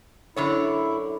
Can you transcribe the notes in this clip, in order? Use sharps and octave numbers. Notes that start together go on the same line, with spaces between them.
F#2 D3 E4 C#5